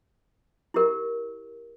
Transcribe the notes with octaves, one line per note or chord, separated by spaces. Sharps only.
E4 G4 A#4